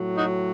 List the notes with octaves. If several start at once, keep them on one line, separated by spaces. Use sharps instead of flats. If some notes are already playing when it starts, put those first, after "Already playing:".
Already playing: A2 F#3
D#4 F#4